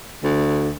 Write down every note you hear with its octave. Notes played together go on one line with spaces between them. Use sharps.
D2